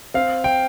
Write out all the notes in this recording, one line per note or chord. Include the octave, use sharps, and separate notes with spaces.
C4 F5
G5